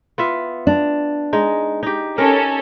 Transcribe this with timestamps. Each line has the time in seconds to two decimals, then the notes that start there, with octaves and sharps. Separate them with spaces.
0.18 B3 F4 E5
0.67 D4
1.33 G#3 D#4
1.83 D#4 G4
2.18 C#4 A4 A#4